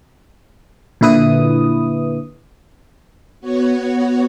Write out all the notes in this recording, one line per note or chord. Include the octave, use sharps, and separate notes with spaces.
A#2 D3 E4 B4 D#6
B3 F#4 C#5